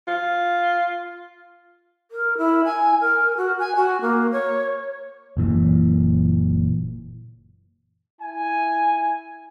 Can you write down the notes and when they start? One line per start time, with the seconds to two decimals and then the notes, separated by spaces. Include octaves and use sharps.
0.08 F4
2.11 A#4
2.38 E4
2.65 G#5
3.01 A#4
3.37 F#4
3.59 G#5
3.76 F#4
4.01 A#3
4.32 C#5
5.37 F#1 A#2 E3
8.21 E4 G#5